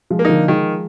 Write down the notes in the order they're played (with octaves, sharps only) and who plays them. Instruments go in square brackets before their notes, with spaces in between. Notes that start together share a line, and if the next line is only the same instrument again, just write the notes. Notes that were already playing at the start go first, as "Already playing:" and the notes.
[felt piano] F3 G#3
[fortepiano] A#3
[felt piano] D3 F3 [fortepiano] D#4
[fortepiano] D#3 [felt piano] F3 G#3